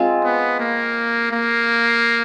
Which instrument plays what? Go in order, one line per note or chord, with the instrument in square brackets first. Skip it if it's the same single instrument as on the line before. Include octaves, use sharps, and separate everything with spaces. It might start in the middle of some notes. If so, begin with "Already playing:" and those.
Already playing: [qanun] G#3 C4 F4 G#4
[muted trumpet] B3
A#3
A#3